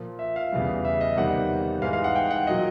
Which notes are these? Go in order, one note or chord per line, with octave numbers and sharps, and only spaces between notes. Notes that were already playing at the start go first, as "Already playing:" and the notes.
Already playing: A#2 F3 A#3
E5
F5
E2 C#3 E3 G3
E5
D#5
E2 C3 D#3 G3 A#3 F#5
G#2 E3 G#3 F5
F5
F#5
G5
F#5
A#2 F#3 A#3 D#5